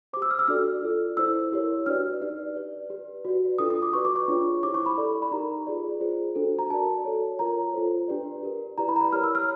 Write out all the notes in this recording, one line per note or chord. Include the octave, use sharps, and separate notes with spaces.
G4 C5 D6
E6
F6
E6
D4 F#4 A4 D5 F6
F4 A4 D5
E4 A4 C5 E6
E4 G4 A#4 C#5
D4 F#4 B4 D5 F6
D#4 G4 B4 D5
G4 B4 D5
G4 B4 D5
F#4 B4 D5
D4 F4 A4 D#6
D#6
D6
F#4 B4 D5 C#6
D6
C#6
D4 F4 G#4 C#5
E4 G4 C5 D6
C#6
B5
E4 A4 D5
B5
D#4 G4 A#4 A#5
F4 G#4 B4 D5
F4 G#4 C5
D4 F#4 A4 C5
A#5
F#4 A#4 D5 A5
F#4 A4 C#5
F4 A#4 C#5 A#5
F4 A4 C5
D4 G4 B4 D5
G4 A#4 D5
E4 G4 B4 D5 A#5
B5
A#5
B5
E4 G4 A#4 C#5 F6
E6
F6